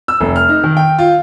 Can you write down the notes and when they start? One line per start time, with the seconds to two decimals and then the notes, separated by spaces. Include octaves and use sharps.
0.08 E6
0.20 F1
0.36 F6
0.49 D#4
0.63 D#3
0.77 G5
0.99 F4